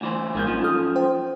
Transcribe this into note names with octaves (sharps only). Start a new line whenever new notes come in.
D2 E3 C5
G#1 A#2 G#3 A#3 G6
F#2 F3 D#4
A4 D#6 F6
C5 G5